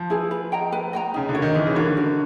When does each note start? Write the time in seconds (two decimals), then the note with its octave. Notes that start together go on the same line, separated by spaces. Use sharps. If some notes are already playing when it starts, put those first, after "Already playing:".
Already playing: F3
0.10 E4 G#4 B4
0.31 B4
0.52 D#5 G5 A#5
0.72 B4
0.93 D#5 G5 A#5
1.14 C#3 D#4
1.29 D3
1.34 F#4 A#4 C#5
1.42 D#3
1.54 E3 D#4
1.67 C#3
1.75 D3 F#4 A#4 C#5
1.97 A#4